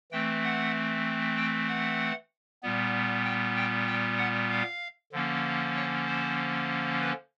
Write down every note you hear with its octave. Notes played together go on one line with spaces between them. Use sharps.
E3 A3 C4 G5
F#5
G5
F#5
A#2 G3 B3
G5
G5
G5
F#5
F5
D3 F3 A#3 C#4
C#5
C5
B4